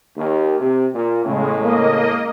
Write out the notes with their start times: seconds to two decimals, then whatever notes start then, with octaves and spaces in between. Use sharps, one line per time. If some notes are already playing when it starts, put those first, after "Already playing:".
0.17 D#2
0.60 C3
0.94 A#2
1.25 E2 A2 C#3 G#3
1.61 A#3 D#5